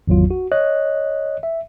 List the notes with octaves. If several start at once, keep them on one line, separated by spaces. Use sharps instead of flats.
G#1 E2 F#3 F4
F#4
C#5 D#5 F#6
E5